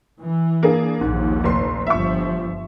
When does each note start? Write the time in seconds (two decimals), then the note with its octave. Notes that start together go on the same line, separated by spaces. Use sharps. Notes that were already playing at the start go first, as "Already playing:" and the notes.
0.22 E3
0.63 A#3 D4 G#4
1.01 A#1 D#2 G#2
1.44 F1 C6
1.87 G1 F3 E5 C#6